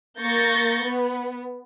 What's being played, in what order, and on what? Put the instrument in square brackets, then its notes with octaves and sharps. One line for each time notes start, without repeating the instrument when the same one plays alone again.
[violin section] A#3 C#6 G6 A6 A#6
B3